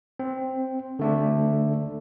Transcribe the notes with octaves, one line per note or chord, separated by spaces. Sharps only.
C4
D3 A3 D4